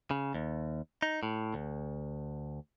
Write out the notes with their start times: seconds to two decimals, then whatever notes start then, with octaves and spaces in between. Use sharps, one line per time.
0.11 C#3
0.34 D#2
1.02 D#4
1.23 A2
1.54 D2